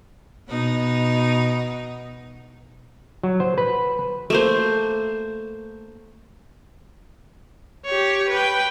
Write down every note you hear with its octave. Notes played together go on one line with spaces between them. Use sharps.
B2 B3 D#4
F#3
C5
B4
A3 A#3 C5
G4 C#5
B4 G5